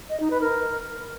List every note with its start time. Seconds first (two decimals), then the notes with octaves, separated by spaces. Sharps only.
0.10 D#5
0.20 D#4
0.30 B4
0.41 A#4